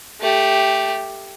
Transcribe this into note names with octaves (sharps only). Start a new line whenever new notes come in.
A3 G4